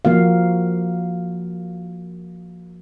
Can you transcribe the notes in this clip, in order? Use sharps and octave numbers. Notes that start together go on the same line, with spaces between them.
F3 A#3 F#4 F5